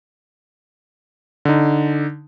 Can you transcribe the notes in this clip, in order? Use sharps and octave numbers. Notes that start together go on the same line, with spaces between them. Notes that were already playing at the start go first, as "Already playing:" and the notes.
D3 D#4